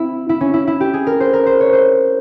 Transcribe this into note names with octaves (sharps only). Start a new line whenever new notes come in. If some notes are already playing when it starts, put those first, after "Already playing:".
Already playing: C4 E4
E4
C#4
E4
E4
G4
G#4
A#4
C5
A#4
C5
C#5
C5